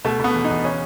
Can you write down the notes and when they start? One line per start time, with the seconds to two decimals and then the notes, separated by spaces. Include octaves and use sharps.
0.05 B2 A3
0.20 B2 B3
0.35 E2
0.44 D#4
0.50 E2
0.65 C#3 C#4